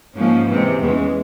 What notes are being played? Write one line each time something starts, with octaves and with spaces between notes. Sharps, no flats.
G#2 F3 A#3 C#4
C3 E3 G#3
E2 E3 G#3 C#4